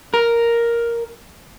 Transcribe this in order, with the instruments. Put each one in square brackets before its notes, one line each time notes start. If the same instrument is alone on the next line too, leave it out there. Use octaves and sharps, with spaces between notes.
[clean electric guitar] A#4